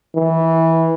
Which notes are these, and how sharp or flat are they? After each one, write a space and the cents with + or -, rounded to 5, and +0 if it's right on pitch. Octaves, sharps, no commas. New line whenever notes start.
E3 -15